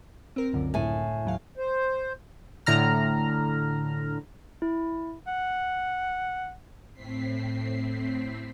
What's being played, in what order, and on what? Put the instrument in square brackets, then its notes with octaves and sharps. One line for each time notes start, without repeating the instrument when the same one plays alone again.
[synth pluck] C4 A#4
C#2 F#2 D3
[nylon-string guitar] A2 G#5
[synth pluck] D#2 F#3 F5
[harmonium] C5
[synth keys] A2 D3 A#5 F6
[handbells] E4
[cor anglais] F#5
[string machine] A2 C4 B6 C7